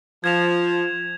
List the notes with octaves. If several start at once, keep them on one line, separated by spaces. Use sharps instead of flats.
F3 G#6 E7 F7